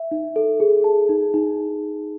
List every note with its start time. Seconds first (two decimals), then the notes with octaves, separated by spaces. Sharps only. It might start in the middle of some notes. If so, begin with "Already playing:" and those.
Already playing: E5
0.11 D#4
0.36 A4
0.60 G#4
0.84 A5
1.09 D#4
1.34 D#4